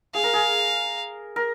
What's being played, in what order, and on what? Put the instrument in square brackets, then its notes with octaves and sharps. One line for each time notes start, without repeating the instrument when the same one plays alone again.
[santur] G#4 [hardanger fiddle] F5
[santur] A#4
G#4
A#4